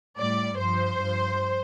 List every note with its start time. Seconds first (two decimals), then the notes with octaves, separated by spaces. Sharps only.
0.18 A2 G3 D5
0.57 G2 F3 C5
0.97 G2 F3